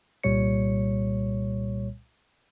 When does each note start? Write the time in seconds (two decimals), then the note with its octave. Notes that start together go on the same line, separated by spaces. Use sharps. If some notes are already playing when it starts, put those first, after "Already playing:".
0.24 C2 A#2 G3 C#5 C#7